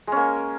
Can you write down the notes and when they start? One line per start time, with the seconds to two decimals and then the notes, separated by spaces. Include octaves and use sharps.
0.07 G#3
0.12 C#4
0.17 A#3